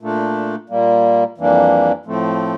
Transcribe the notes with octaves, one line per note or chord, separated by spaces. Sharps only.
A#2 A3 D4
A#2 G3 A#3
F2 E3 G3 A#3 D4
A2 F3 A3 C4